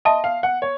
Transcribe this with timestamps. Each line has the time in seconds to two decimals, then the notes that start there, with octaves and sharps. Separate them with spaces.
0.05 D#5 E5 A5 C6 D#6
0.24 F5
0.43 F#5
0.62 C#5